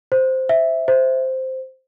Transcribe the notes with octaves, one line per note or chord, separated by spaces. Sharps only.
C5
E5
C5